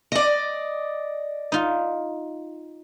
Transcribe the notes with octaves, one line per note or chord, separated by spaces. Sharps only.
D5 D#5
D#4 F4